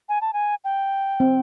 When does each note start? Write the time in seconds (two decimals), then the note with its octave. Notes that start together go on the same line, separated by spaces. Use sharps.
0.09 G#5
0.21 A5
0.33 G#5
0.64 G5
1.20 C4